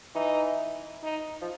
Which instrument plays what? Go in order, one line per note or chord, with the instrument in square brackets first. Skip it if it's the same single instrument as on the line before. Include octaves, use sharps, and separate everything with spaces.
[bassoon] E3 [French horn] D#4
[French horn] D#4
[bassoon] F3